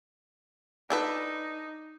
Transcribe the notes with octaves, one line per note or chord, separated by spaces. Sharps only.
D4 D#4 A4 B4